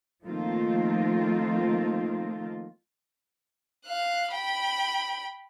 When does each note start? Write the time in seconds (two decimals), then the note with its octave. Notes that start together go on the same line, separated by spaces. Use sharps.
0.24 D#3 F3 A3 A#3 C4 F4
3.85 F5 F#6
4.32 G5 B5